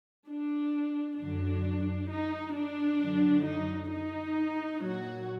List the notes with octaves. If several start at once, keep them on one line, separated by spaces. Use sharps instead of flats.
D4
F#2 D3 F#3 D4
D#4
D4
F#2 D3 F#3
D#4
D#4
A#2 F#3 F#4